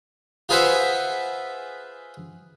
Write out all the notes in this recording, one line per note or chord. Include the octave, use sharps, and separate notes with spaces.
F4 G#4 B4 C5 E5 F#5